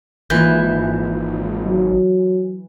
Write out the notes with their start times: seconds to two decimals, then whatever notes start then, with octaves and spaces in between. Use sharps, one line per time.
0.30 G#1 E3 A#3 F4 G6
1.66 F#3